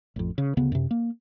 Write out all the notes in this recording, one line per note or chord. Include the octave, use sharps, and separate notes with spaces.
A1 F2
C#3
D2 C#3 B3
F#2 C3
A#3